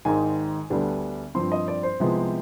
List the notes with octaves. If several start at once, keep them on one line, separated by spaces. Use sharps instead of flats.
G#1 G#2 D#3 G#3 G#5
D2 D3 G3 B3 D4
G2 F3 C4 C6
D#5
D5
C5
C2 C3 F3 G#3 B3